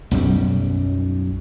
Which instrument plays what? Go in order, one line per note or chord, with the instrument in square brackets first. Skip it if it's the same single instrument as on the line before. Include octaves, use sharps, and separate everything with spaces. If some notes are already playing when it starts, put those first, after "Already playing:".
[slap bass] B1 F#2 G3